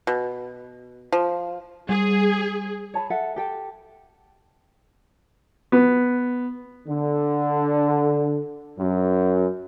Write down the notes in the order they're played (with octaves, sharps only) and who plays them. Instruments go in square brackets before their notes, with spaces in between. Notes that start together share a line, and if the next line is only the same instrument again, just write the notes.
[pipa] B2
F3
[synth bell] G3 [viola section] G#4
[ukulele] C#5 A5 B5
A4 E5 F#5
G4 A4 G5
[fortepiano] B3
[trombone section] D3
F#2